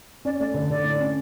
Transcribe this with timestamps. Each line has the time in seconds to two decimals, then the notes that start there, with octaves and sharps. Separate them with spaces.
0.25 C#4 D5
0.40 A3 D5
0.54 D3
0.70 D3 D5
0.84 A2
1.00 C#4